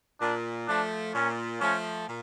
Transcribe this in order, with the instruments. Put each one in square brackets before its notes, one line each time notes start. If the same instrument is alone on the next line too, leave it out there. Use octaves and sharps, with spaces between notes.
[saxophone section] A#2 [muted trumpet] D4
[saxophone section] F3 A3 [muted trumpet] D4
[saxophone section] A#2 [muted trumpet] C#4
[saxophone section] F3 A3 [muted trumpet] C#4
[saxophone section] A#2